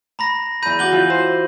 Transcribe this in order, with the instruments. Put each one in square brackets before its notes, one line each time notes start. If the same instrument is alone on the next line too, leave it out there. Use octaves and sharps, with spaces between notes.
[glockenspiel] A#5 B5 A#6
[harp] E2 A#5 [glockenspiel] B5 G6 D#7
[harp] F#4 F#5 [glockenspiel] D6 F#7 G7
[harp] E3 F4 G6
C5